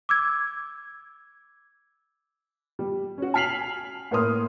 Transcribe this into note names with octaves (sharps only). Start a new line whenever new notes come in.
D6 E6 G#6
G3
C#4 F#4
G#5 F6 B6 C7 F7 F#7
A2 A#3 A#4 C6 D#6 F6